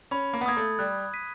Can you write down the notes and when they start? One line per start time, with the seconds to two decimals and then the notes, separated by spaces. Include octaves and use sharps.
0.11 C#4 B5
0.34 A#3
0.41 B3
0.46 A#3 D#6 G#6
0.57 A3
0.79 G3 F#6
1.14 B6 D#7